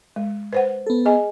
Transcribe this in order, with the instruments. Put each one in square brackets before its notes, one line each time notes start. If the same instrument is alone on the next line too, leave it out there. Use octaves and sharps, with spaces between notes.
[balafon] G#3
B4 C5 F#5
[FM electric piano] B3 A4
[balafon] G#4 D#5 G#5